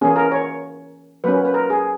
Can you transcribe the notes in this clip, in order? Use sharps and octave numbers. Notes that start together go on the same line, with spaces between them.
E3 A#3 C#4 G#4
A#4
C#5
F#3 A#3 C#4 B4
B4
A#4
G#4